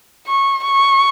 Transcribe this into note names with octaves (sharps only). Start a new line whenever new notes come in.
C#6
C#6